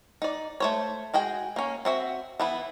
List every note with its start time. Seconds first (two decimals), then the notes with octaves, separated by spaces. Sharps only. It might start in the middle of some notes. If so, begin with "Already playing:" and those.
0.22 D#4 D5
0.60 A3 C5 C#5
1.14 G#3 F#4 G#4 G5
1.56 A#3 C#4
1.85 C4 F#4 E5
2.40 E3 B3 E4